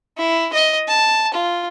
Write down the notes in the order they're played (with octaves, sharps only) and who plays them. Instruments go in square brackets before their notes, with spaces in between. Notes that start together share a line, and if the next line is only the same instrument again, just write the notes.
[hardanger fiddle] E4
D#5
A5
F4